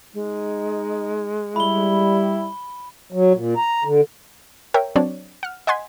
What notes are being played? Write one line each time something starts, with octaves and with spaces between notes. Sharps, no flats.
G#3 D#4
G3 E4 B5 G7
F#3
A#2
A#5
D3
A#4 C#5 E5 G5
F#3 C4 D4 C#5 D5
F#5 F6
D#5 F#5 G#5 C6 G#6 B6